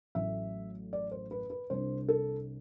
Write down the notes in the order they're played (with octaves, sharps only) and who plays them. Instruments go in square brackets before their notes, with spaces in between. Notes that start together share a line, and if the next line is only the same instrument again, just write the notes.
[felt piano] A1 A2 F#3 E5
D5
C5
B4
B4
C2 C3 G3 D4 C5
A4